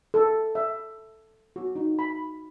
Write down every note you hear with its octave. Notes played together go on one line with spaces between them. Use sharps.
A4
E5
F#4
D#4
B5